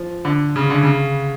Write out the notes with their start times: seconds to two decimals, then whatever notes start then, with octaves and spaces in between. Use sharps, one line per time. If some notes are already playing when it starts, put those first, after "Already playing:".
Already playing: F3
0.25 D3
0.56 C#3
0.70 D3
0.83 C#3